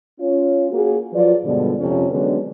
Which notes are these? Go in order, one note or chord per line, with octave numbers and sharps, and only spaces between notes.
C#4 F4 C#5
A#3 F#4 G#4
F3 F#3 F4 B4 D5
G2 B2 D3 F3 G3 G#3
F2 C3 F3 C#4
D3 F#3 G#3 B3 C#4 D4